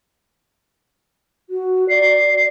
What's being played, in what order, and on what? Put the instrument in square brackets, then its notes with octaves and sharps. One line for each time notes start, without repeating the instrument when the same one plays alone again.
[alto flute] F#4
[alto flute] D5 [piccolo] C7